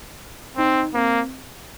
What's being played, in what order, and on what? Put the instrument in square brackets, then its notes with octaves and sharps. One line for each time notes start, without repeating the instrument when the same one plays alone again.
[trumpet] C4 [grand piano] D#4
[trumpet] A#3 [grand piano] C4